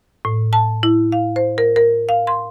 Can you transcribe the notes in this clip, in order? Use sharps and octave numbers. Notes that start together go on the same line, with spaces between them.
A2
A5
E4
F5
C5
A#4
A#4
F5
C6